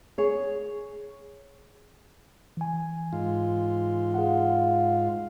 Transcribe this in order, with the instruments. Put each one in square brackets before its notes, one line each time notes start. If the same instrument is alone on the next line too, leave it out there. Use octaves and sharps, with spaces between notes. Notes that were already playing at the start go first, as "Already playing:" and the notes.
[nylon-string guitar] G#4 C#5
[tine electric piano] E3 G#5
[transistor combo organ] G#2 F4
[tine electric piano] G#4 F5 F#5